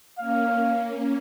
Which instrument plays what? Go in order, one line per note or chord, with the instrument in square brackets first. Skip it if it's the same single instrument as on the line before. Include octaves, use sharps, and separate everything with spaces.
[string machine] A#3 C#4 [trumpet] F5